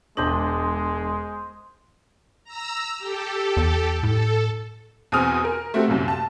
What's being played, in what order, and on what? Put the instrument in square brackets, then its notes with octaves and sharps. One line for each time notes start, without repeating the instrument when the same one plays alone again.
[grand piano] E1 D4 F#7 [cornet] G#3 [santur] C5 D#5
[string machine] A#5 E6
G4 A4
[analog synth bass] E2
[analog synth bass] A2 [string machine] A4
[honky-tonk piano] E2 B2 C4 G#5 D#6 F6
A#4
A3 C4 F#4 G4 A4
C2 F#2 A#2
A5